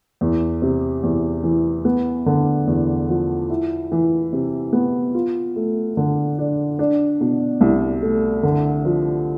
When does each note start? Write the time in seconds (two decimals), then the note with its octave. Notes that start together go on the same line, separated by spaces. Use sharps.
0.21 E2
0.62 C3
1.03 E2
1.44 E3
1.85 B3
2.26 D3
2.67 E2
3.09 F3
3.50 E4
3.92 E3
4.33 C3
4.73 B3
5.15 F4
5.56 A3
5.97 D3
6.39 D4
6.79 D4
7.20 B2
7.61 C2
8.02 A3
8.43 D3
8.85 F3